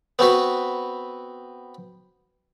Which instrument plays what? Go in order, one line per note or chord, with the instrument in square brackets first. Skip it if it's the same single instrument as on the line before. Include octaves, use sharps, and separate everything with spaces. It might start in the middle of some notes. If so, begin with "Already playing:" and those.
[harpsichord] B3 C4 F#4 B4